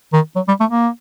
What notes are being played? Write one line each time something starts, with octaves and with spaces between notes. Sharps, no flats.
D#3
F#3
G3
A3
A#3